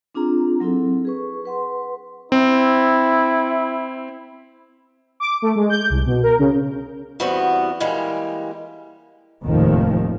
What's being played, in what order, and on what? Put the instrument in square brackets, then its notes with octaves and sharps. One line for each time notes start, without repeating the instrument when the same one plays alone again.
[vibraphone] C4 D4 F4 G#4 A#5
F#3 C4 E4 A4
G#4 B4 C#6
B4 F#5 C6
[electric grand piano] C4 [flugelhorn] E4
[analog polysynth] D6
A3
G#3
G6
C2
B2
A#4
C#3
[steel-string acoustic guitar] E2 G3 B3 C4 F#4
E3 G3 G#3 A#3
[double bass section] F1 D#2 A2 D#3 F3